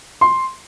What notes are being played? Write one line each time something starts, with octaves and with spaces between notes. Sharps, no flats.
C6